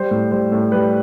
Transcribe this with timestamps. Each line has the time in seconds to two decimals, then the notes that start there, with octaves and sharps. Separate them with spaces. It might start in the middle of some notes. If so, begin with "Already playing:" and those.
Already playing: G3 C5
0.11 A2
0.31 G3 C5
0.52 A2
0.72 G3 B4